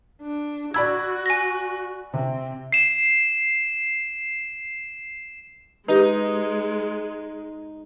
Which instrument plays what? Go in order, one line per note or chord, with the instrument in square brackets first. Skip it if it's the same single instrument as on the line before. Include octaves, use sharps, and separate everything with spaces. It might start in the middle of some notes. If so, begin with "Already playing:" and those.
[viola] D4
[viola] F#4 [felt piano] D5 B5 E6 [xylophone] G#6
[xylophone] G#5 A#6
[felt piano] C3 [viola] C4
[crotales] C7 E7
[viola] G#3 [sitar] D#4 [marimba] G4 B4